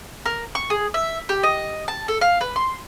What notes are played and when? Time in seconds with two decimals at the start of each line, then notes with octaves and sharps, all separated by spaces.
0.26 A#4
0.55 C#6
0.70 G#4
0.94 E5
1.29 G4
1.43 D#5
1.88 A5
2.08 A4
2.21 F5
2.41 B4
2.56 C6